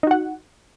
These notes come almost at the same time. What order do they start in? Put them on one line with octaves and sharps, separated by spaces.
D#4 F#4 F#5